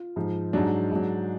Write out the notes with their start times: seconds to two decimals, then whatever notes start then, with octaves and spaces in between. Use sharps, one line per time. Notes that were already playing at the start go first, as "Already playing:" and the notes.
Already playing: F4
0.16 G#2 F3
0.53 G#2 F#3 D4
0.91 G#2 F#3